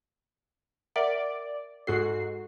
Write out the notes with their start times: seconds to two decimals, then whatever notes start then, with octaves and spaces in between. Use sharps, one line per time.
0.96 A#4 D5 E5 F#5
1.87 G#2 F#4 A4 C7